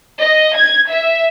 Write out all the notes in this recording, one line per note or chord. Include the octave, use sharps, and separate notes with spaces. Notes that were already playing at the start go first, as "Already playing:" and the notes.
D#5
G#6
E5